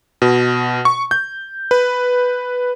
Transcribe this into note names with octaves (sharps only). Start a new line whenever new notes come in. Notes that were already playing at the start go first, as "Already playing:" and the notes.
B2
C#6
G6
B4